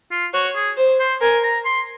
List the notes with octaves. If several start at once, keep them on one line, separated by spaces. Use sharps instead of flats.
F4
F#4 C#5
G#4
C5
C5
A#4 G#5
A#5
C6